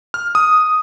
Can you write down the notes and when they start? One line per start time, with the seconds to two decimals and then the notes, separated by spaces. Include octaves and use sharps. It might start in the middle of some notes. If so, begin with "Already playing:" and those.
0.14 F6
0.35 D#6